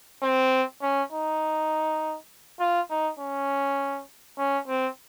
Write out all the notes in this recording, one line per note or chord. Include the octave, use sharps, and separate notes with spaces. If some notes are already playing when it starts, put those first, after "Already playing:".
C4
C#4
D#4
F4
D#4
C#4
C#4
C4